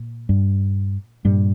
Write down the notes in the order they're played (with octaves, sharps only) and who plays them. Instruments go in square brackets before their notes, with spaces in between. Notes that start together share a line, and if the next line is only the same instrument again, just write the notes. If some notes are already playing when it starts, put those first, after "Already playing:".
Already playing: [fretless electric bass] A#2
G2 G3
G2 A#2 G3